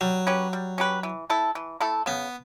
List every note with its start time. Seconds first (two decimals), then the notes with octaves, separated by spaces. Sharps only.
0.01 F#3 G3
0.27 C#4 G4 B4
0.53 G3
0.78 C#4 G4 B4
1.03 E3
1.30 A3 E4 A4
1.55 E3
1.80 A3 E4 A4
2.06 C#3 B3